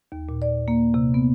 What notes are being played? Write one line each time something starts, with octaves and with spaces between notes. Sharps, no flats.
D#2
A#2
D5
A#3
C3
B3